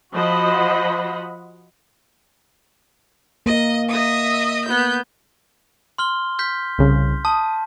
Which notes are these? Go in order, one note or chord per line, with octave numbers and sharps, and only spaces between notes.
F3 F#4 C5 D#5 F#5 B5
A#3 A#4 D#5
D#5 E5 D#6
B3 G6
C6 F6 G7
F6 G6 B6
C2 C#3
A5 D#6